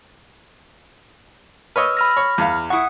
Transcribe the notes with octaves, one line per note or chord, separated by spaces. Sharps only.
B4 C#5 D#5 E6 F6
B5 F6 A#6
C#5
E2 F5
E4 F#5 C#6 D#6